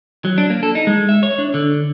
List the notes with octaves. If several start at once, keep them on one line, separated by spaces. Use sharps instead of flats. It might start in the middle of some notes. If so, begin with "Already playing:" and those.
F#3
D4
A#3
A4
D#4
G#3
E5
C#5
D4
D3